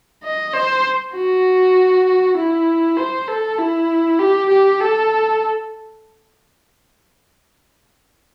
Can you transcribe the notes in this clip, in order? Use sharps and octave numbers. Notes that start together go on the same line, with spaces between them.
D#5
C5
F#4
E4
C5
A4
E4
G4
G4
A4